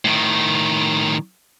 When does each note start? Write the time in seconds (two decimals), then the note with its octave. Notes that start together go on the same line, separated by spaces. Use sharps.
0.05 A2 D#3